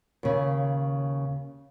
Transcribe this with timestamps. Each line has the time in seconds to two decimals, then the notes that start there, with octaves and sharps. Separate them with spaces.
0.23 D#2 C#3